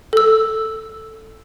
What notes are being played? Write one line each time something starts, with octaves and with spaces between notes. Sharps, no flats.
A4 E6